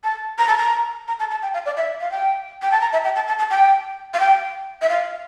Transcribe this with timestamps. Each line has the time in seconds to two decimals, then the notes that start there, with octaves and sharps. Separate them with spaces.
0.04 A5
0.38 A#5
0.48 A5
0.57 A#5
1.08 A#5
1.19 A5
1.31 A5
1.42 G5
1.54 F5
1.66 D5
1.77 E5
2.01 F5
2.11 G5
2.62 G5
2.71 A5
2.81 A#5
2.93 E5
3.04 G5
3.15 A5
3.28 A5
3.39 A5
3.50 G5
4.14 F5
4.20 G5
4.82 E5
4.89 F5